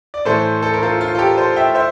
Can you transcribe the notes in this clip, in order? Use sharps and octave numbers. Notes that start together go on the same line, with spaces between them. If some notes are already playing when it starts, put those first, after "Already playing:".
D5
A2 E3 A3 A4 C5
A4
A#4
F4 A4
F4
A4
G4 A#4
A4 C5
E5 G5
C5 E5